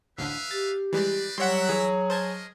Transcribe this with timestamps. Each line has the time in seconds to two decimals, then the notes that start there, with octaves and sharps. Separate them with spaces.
0.18 A1 D2 D3 B4 E5 F5
0.51 G4 A6
0.93 E3 G3 G#3 C4 B4 D5
1.38 F#3 G3 A#4 C#5 E5 F#5 C6
1.69 E3 G#4 C#5
2.10 G#3 A#4 C5 D#5 A5 G#6